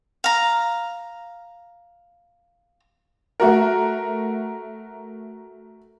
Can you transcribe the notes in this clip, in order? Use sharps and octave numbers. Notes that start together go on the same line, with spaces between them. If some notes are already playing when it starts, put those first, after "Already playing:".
F5 A#5
A3 F#4 A#4